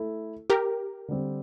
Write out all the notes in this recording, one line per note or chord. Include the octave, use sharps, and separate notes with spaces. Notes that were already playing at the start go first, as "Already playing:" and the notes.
Already playing: A3 E4 A4
G4 A#4
D3 G3 C4